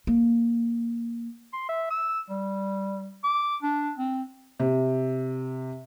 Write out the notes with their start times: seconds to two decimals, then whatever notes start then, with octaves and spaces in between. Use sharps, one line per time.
0.07 A#3
1.53 C6
1.69 E5
1.90 E6
2.30 G3
3.24 D6
3.62 D4
3.98 C4
4.60 C3